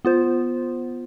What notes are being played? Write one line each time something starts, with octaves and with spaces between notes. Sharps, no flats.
B3 F4 C5